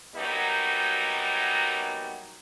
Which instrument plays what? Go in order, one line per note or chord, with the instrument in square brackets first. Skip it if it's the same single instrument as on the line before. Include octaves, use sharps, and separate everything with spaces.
[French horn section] F#2 F#3 G3 A#3 B3 D#4